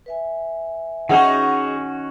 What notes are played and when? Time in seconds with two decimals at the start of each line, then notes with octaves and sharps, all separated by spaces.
0.06 B4 E5 G#5
1.09 D#3 C#4 D#4 F#4 G#4 F#5